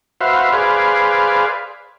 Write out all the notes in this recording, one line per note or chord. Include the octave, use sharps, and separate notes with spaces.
F#4 B4 C5 E5 F5
G#4 B4 C5 D5 F5